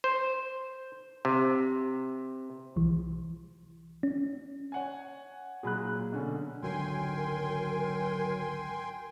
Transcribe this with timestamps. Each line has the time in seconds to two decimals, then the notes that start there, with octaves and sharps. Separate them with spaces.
0.04 C5
1.25 C3
2.76 B1 E3
4.03 C#4
4.72 C#5 F#5 G#5
5.63 A#2 F#3 G#4 B5 F#6
6.12 B2 D3 C#4
6.63 G#1 C#2 D3 F#3 A#4 G5 G#5 C6